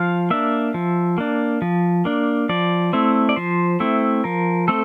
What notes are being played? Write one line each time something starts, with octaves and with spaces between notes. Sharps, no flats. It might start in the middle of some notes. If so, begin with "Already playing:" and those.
Already playing: F3 F5
A#3 D4 E5
F3
A#3 D4
F3
A#3 D4
F3 D5
A3 C4 E4
D5
F3 C5
A3 C4 E4
F3 A#4
A3 C4 A4